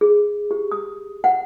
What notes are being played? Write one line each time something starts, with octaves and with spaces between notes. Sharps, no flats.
G#4
G4
D#6
F#5